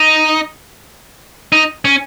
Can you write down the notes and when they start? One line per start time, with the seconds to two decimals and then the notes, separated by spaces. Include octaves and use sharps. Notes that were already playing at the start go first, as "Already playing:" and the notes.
Already playing: D#4
1.52 D#4
1.85 C#4